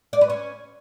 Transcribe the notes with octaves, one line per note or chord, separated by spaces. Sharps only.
D5
B4
C#4